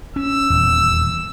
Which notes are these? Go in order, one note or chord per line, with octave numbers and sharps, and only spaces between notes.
C#4 E6
D#1 E2